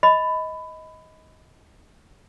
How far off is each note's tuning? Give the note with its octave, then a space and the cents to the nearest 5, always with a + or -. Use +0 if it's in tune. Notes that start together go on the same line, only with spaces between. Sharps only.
D#5 +20 B5 +20